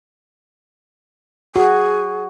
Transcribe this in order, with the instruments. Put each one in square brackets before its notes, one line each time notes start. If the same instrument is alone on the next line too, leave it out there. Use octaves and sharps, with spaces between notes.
[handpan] F#4 [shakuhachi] G#4